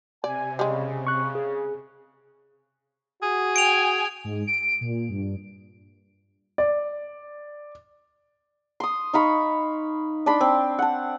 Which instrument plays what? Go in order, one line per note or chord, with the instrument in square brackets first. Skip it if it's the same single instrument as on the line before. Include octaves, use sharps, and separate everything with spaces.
[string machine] C3 [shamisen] D5 [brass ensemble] G#5
[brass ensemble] C#3 [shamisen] G3 G#3
[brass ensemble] C#3 [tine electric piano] C#6 F#6
[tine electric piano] G#4
[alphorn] F#4 [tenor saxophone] G#4
[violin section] G5 G#5 [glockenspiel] D7 F7
[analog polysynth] G#2
D7
A#2
G2
[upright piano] D5
[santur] C6 D#6
D#4 F5 B5 C#6
D4 A5 B5 C6
C4
F#5 A5